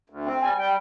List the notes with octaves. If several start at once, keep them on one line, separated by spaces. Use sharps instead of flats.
D2
C4
G3 G#5
G3 G5